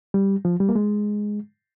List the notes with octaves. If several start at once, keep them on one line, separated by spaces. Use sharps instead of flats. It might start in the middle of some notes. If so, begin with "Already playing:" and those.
G3
F3
G3
A#3
G#3